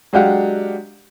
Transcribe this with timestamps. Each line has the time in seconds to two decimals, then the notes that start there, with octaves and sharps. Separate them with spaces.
0.13 F#3 G#3 D4 G4 F5 F#5